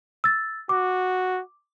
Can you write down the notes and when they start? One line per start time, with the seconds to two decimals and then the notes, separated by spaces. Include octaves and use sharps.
0.24 E6 A6
0.69 F#4 D6